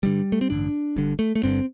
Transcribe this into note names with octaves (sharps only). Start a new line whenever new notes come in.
A1 G2 D3 G3
A3
C4
A1 G2 D3 D4
G1 G2 D3
A3
A3
G1 G2 D3 C4